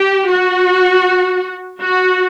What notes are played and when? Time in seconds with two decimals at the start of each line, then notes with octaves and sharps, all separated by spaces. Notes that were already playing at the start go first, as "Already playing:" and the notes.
Already playing: G4
0.28 F#4
1.81 F#4